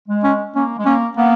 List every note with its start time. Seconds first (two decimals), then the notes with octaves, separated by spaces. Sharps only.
0.09 G#3
0.24 C#4
0.55 A#3 C#4
0.78 G#3
0.86 A#3 C#4
1.17 A#3 B3